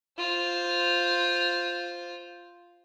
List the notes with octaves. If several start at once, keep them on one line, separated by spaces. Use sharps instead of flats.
F4 C5